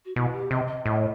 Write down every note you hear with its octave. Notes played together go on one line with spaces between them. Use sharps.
F#4
B2 E4
G4
C3 D#5
D#5
A2 D#5